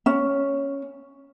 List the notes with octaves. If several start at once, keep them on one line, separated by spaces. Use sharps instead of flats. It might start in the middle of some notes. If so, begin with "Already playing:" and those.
C#4